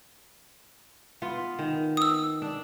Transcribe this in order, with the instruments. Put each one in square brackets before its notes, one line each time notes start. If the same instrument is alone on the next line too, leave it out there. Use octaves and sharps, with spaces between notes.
[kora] B3 F4
D#3
[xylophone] D#6 E6
[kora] D4